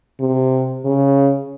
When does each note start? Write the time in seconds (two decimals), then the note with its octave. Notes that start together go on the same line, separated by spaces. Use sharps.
0.20 C3
0.85 C#3